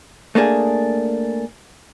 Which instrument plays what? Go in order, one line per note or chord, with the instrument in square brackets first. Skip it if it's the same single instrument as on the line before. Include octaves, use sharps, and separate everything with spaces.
[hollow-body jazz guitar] A3 A#3 D4 G#4